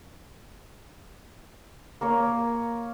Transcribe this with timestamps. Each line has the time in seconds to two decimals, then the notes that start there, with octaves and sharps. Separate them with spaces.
2.01 A#3 A#4 C#5